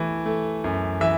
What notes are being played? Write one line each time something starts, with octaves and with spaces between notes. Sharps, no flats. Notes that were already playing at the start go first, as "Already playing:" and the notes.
Already playing: E3 A3
A3
F#2
E3 E5